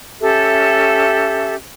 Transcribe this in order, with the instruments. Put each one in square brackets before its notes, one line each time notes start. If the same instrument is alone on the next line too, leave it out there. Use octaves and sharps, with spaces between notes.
[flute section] C#4 G4 A4 E5